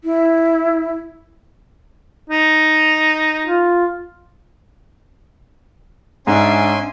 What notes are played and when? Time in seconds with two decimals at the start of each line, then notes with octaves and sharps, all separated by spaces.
0.04 E4
2.30 D#4
3.45 F4
6.27 G#2 C#4 D4 E5 G#5 C6